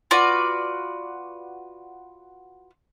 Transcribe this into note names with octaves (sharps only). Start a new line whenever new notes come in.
F4 F#4 B4 D5